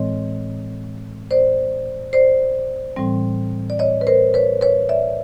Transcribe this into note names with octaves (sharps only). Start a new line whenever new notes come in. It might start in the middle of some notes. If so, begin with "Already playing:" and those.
Already playing: A2 E3 G#3 C4 C#5 D#5
C5 D5
C5 D5
A2 E3 G3 C4
D5
C#5 D#5
B4
A#4 C5
B4 C#5
B4 C#5
D5 E5